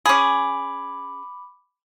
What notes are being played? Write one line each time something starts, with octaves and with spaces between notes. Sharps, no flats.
C#4 G#4 B5 D6